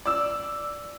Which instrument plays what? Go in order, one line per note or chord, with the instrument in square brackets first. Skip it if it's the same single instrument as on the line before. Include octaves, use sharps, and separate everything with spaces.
[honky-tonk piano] D5 E6